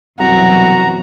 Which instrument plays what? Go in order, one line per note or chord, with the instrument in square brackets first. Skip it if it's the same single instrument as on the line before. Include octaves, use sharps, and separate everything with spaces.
[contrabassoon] C2 [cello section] F#2 B2 E3 [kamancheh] F#4 [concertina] A#5